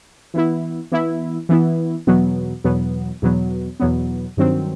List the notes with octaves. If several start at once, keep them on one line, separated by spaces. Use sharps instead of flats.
E3 B3 E4
E3 B3 E4
E3 B3 E4
E2 B2 F#3 B3
E2 B2 F#3 B3
E2 B2 F#3 B3
E2 B2 F#3 B3
G2 D#3 F#3 C4